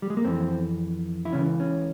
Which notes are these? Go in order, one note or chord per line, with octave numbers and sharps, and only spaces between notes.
G3
G#3
A#3
F2 E3 C4
E4
C#2 C#3 E3 C#4
C#4